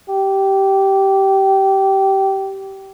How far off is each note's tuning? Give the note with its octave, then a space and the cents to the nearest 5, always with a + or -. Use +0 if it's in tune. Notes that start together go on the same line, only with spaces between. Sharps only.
G4 -15